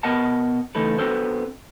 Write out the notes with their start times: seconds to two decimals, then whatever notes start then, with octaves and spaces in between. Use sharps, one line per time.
0.03 B2 B3 A#4 D#5 F#5 A5
0.75 C#3 E3 A3 D#4 A4 B4
0.98 B3 C4 D4 F#4 A4 C5